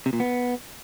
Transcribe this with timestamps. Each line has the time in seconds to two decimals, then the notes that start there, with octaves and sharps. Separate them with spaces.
0.06 C3
0.13 A#2
0.20 B3